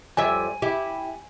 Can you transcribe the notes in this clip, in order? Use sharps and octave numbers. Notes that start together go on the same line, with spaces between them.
F2 G3 E5 G#5
E4 G4